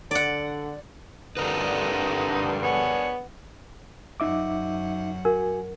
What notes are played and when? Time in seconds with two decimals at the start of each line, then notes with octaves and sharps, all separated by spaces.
0.11 D3 D5 F#5
1.37 G2 D3 D4 D#4 A#4 B4 D#5 F#5
2.62 B3 G#4 C#5
4.20 F#2 D#4 E5 F#5 D6
5.25 F#4 A#4 G#5